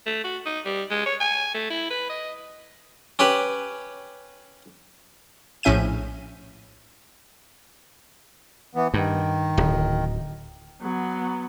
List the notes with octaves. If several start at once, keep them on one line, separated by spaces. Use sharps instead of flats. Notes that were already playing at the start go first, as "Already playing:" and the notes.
A3
F#4
D#4
G3
G#3
C#5
G#5
A3
E4
B4
D#5
C#4 G4 B4 B5
A#1 A2 C#4 E5 G6 D#7
E3 B3
G2 D#3
D1
F#3 B3